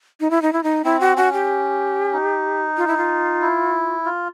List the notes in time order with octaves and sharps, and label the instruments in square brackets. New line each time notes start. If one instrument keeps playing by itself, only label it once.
[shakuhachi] D#4
E4
D#4
E4
D#4
[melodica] C4 [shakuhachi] E4
[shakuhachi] F#4
[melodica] C#4 [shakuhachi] F#4
[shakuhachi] G4
[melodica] D#4
[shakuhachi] F4
E4
F4
[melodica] E4
F4